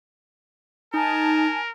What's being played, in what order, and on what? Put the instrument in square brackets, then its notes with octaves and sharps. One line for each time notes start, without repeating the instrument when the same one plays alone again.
[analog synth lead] D#4 [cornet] A#4 [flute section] G#5 A5